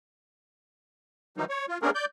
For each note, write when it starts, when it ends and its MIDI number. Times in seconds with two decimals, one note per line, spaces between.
1.37 1.45 51
1.37 1.45 52
1.37 1.45 54
1.37 1.45 55
1.37 1.45 63
1.49 1.66 73
1.69 1.78 65
1.82 1.90 57
1.82 1.90 59
1.82 1.90 61
1.82 1.90 62
1.82 1.90 68
1.82 1.90 70
1.95 2.05 74
1.95 2.05 91